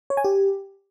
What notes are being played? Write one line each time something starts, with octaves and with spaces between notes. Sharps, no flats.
C#5
G#5
G4